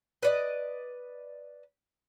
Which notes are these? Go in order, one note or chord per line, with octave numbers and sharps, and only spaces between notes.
B4 D5 D#5